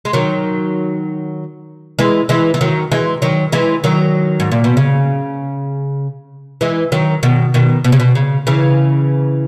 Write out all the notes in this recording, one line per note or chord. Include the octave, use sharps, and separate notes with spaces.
G#3
D#3 F#3
E3 G#3
E3 G#3
E3
D#3 F#3
E3 G#3
D#3 F#3
E3 G#3
D#3 F#3
G#2
A#2
B2
C#3
E3 G#3
D#3 F#3
B2 D#3
B2 D#3
B2
C#3
B2
C#3
C#3 E3